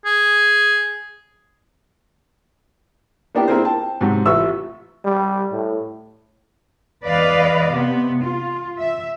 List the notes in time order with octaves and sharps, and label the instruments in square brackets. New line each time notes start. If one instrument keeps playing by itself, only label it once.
[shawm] G#4
[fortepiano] A#3 B3 D4 E4 G4
A#3 C4 E4 G#4 A#4 C5
G5 A5
G#2 C3 F#3
A1 F4 E5 C#6 E6
[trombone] G3
A2
[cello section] E2 B4 D5 D#5 F5
C3 B3
F4
E5